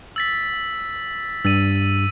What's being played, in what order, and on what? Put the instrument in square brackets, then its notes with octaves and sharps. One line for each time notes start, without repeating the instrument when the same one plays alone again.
[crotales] E6 A6 B6
[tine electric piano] G2 [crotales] E6 A6 D#7